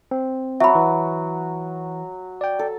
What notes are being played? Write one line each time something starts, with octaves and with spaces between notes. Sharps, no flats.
C4
F#3 F#4 E5 B5
E3
D5 G5
A4